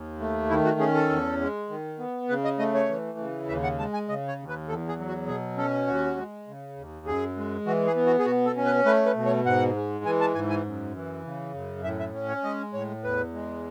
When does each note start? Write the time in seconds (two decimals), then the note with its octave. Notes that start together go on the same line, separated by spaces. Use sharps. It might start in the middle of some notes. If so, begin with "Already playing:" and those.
Already playing: D#2
0.20 A3
0.50 D#3 E4
0.65 F#4
0.80 C#4 G#4
0.94 A4
1.10 E2
1.40 G#3
1.69 D#3
1.99 B3
2.29 C#3 B4
2.44 D#5
2.59 A3 D#5
2.74 C#5
2.89 E3
3.18 C#3
3.48 D#2 E5
3.63 F#5
3.78 G#3 A5
3.94 G#5
4.08 C#3 D#5
4.28 C#5
4.39 D#2
4.48 B4
4.68 E2 A4
4.88 G#4
4.98 F#3
5.08 F#4
5.27 B2 G#4
5.57 C#4 A4
5.87 D#2 F#4
6.17 G#3
6.47 C#3
6.76 D#2
7.06 F#2 G#4
7.37 G#3
7.66 E3 F#4
7.86 G#4
7.96 B3
8.06 F#4
8.19 G#4
8.26 B2 F#4
8.46 A4
8.56 C#4
8.65 B4
8.86 A3 B4
9.06 B4
9.15 B2
9.26 C#5
9.45 G#2 F#5
9.76 G#3
10.05 E3 G#5
10.21 A5
10.35 G#2 G#5
10.50 G#5
10.65 F#2
10.95 E3
11.25 C#3
11.54 F#2
11.84 A2 E5
12.00 E5
12.14 C#4
12.29 C#5
12.43 G#3 D#5
12.73 A2 C#5
13.03 E2 B4
13.33 G#3